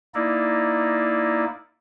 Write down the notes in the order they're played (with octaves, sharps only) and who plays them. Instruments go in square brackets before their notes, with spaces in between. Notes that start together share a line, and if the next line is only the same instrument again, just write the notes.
[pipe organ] A#3 D#4 E4 D5